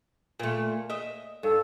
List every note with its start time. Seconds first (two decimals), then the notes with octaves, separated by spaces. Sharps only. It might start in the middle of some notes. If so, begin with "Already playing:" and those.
0.40 A#2 A3
0.90 D#5 E5
1.43 G2 A4